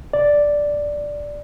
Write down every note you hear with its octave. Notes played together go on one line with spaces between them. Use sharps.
D5